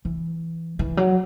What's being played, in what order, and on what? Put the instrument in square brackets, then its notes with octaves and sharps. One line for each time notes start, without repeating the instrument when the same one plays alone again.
[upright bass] E3
E3
F#3